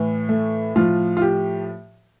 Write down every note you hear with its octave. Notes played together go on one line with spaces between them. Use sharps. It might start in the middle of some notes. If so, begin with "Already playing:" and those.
Already playing: A2 E3
A3
A2 F3 F4
F4
G4